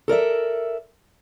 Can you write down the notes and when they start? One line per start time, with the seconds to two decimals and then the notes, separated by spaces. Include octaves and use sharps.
0.08 A4 A#4 D5 E5